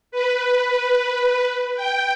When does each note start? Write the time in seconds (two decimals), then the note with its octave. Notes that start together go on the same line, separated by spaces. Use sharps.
0.12 B4
1.76 G5